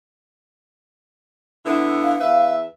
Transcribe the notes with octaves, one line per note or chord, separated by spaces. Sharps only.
D3 B3 E4
F5
E2 B4 E5